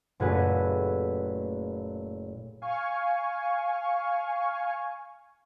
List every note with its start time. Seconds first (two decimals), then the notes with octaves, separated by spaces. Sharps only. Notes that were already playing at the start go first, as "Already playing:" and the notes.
0.20 F#1 A#2 A3 F#4 G#4 B4
2.62 F5 G#5 C#6